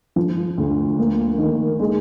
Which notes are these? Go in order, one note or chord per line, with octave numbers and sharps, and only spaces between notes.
F3
D2
A#3
D#3
G#3